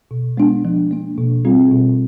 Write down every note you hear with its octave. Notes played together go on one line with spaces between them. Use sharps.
B2
G#3 B3 D4
F3
A#3 D4
B2
G3 C4 F4 G#4
B2